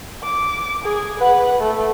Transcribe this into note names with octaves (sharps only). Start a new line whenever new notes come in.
D6
G#4
B4 F#5
A3